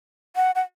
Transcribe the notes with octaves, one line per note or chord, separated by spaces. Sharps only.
F#5
F#5